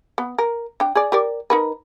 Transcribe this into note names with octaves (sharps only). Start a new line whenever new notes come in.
B3
A#4
D4 G5
G#4 D5
G4 A#4 D5
D#4 A#4 B4